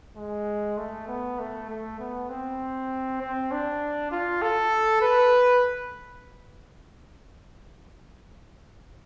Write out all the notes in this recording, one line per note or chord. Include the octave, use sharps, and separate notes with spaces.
G#3
A3
B3
A3
A3
B3
C4
C4
D4
F4
A4
B4